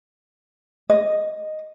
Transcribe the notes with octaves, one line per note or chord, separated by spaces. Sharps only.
D#5